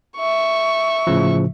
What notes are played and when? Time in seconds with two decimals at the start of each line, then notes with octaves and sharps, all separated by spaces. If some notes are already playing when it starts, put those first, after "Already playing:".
0.17 E5 C#6
1.07 A2 C#3 F3